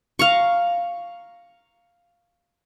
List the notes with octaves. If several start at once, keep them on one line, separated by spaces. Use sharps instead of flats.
F5 A#5 C#6